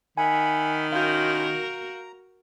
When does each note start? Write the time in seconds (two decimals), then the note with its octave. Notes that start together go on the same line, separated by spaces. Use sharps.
0.18 D#3 E5 F#5 G#5 B5
0.92 C#4 E4 F#4 A#4 F5 C6 G6
1.63 A#5